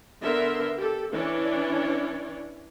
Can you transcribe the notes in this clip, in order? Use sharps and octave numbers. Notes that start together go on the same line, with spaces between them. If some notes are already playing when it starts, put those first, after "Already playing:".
D3 B3 A#4 E5 C6
G4 A4
E3 C#4 D4 C#5 D5